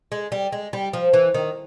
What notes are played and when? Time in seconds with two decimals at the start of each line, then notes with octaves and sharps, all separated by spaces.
0.12 G#3
0.32 G3
0.52 G#3
0.73 G3
0.93 F3
1.13 E3
1.34 D#3